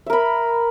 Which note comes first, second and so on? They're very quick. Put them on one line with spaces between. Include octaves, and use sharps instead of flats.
E5 A#4 B5